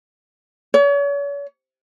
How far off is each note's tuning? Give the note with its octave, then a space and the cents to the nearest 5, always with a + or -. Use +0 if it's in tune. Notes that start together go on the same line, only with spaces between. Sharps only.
C#5 +40